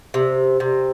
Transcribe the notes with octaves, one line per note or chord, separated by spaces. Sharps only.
C3
C3